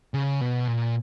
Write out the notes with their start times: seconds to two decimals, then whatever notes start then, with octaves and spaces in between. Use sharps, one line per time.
0.14 C#3
0.41 B2
0.67 A#2